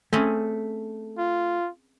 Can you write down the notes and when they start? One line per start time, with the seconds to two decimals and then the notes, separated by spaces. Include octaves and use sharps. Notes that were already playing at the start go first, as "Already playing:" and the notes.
0.13 A3 C4 C#4 G#4
1.18 F4